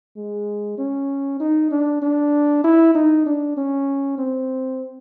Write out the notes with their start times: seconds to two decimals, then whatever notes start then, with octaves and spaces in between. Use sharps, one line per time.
0.17 G#3
0.78 C#4
1.40 D#4
1.71 D4
2.02 D4
2.64 E4
2.95 D#4
3.26 D4
3.57 C#4
4.18 C4